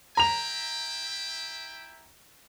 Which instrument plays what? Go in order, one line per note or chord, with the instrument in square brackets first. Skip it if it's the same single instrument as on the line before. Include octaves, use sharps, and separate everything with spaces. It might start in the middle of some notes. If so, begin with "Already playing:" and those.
[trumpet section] E4 E5 G5 [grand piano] A#5 F7